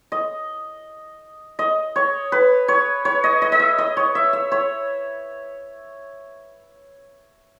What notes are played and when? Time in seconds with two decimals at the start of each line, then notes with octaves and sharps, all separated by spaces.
0.12 D#5
1.59 D#5
1.96 C#5
2.32 B4
2.68 C#5
3.05 C#5
3.24 D#5
3.42 D#5
3.52 D#5
3.60 E5
3.78 D#5
3.97 C#5
4.15 E5
4.33 E5
4.52 C#5